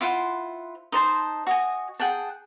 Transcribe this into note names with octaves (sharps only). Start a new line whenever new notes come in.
E4 F4 C5 F#5
D#4 C5 A5 C6
F#4 D#5 G#5
G#4 F#5 G5 A5